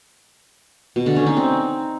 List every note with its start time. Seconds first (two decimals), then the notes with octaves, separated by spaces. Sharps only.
0.96 B2
1.06 D3
1.16 C#4
1.26 D#4
1.37 C4